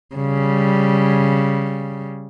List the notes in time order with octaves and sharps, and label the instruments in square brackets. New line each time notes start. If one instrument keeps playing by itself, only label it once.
[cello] C#3 G3